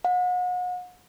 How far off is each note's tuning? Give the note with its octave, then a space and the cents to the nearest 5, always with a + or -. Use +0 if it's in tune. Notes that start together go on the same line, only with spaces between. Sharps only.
F#5 -40